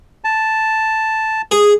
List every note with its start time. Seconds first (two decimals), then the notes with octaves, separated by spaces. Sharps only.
0.24 A5
1.51 G#4